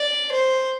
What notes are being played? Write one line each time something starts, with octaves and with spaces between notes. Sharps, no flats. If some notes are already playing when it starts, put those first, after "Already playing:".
Already playing: D5
C5